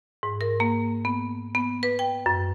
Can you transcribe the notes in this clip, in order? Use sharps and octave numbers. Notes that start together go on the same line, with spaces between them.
G#2
A#4
A#3
B3
B3
B4
G5
F#2